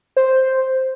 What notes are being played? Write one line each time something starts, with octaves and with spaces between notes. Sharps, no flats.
C5